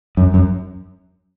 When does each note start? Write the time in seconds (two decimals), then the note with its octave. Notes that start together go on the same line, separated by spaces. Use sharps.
0.17 F#2
0.34 F#2